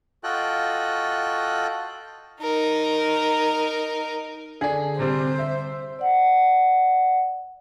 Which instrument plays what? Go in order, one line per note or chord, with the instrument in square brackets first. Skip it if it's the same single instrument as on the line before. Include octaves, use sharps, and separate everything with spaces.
[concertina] F4 F#4 A4 D#5 G5 F#6
[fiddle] D#4 A#4
[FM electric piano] D3 D4 [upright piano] G#4
[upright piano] C3 G3 C4 [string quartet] C5
[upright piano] E5
[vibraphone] D5 F#5